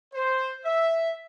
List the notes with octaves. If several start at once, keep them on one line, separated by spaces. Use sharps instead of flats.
C5
E5